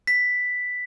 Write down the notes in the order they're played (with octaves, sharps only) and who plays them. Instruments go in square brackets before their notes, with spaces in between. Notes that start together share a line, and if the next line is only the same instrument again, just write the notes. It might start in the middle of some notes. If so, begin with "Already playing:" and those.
[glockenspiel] B6